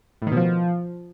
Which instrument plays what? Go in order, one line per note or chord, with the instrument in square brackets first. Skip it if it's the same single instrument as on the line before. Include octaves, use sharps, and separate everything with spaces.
[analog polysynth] A2
D#3
B2
F3